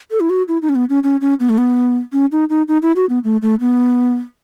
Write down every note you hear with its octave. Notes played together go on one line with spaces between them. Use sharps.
A4
E4
F#4
E4
D#4
C#4
B3
C#4
C#4
C#4
B3
A3
B3
C#4
D#4
D#4
D#4
E4
F#4
B3
A3
A3
B3